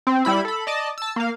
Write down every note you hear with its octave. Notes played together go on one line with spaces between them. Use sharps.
C4
G3 E4 B5
A4 B5
D5 D#5 A5
A5 E6
A#3 F5